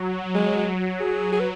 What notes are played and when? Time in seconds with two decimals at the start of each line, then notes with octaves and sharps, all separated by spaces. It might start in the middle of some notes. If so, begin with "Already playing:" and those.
Already playing: F#3
0.35 G#3
1.00 F#3 G#4
1.32 G#4
1.40 B4